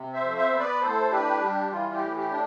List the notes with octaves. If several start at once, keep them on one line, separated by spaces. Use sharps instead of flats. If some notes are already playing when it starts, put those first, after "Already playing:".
Already playing: C3
C5 E5
F2
C5 E5
B3
B4 D5
A2 A4 C5
D4 G4 B4
G3 G4
E3 F4
G4
A2
G4
D4